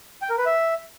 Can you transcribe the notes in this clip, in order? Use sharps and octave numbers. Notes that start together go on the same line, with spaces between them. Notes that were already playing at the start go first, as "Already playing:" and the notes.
G5
A#4
B4
E5